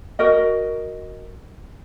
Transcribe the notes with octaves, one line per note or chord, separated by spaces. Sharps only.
F#4 A#4 D#5